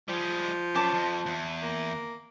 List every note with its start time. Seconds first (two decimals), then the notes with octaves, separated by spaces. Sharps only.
0.09 F3 G3 G#3
0.76 F#2 A5 D6
0.94 F2
1.26 E2
1.62 A#3